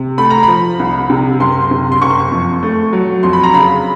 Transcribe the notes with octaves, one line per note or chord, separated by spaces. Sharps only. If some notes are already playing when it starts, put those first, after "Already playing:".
Already playing: C3
A3 B5
A#5
F3 B5
C2
C3
F#1 C6
C3
C6
F#1 C#6
F2
A3
F#3
F2 C6
B5
A#5
C#3 B5